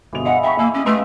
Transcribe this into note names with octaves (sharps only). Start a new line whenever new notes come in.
G1 B2 E3 F3 G#3 F7
E4 G#4 D#5 F#5
E5 G5 B5 C#6
A#3 E5 G#5 E6
C#4 G4 D#5
G#3 A3 B4 F5 C6 E6